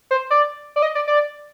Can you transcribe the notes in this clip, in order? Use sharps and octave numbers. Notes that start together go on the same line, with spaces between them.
C5
D5
D5
D#5
D5
D5